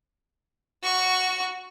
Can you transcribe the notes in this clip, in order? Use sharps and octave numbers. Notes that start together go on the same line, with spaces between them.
F#4 C#6